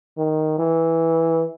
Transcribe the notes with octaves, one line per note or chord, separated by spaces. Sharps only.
D#3
E3